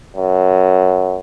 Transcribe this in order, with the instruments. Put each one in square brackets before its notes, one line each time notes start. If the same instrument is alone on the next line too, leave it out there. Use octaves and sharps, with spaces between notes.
[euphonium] F#2